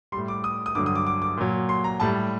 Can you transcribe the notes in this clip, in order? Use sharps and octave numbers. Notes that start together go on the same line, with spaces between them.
A2 G3 C6
D6
D#6
D#6
G2 D3 F#3 D6
D#6
D6
D6
D6
A#2 F#3
C6
A#5
A2 G3 A5